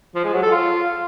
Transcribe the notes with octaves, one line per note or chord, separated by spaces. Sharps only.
F3
G#3
F#3
A4
F4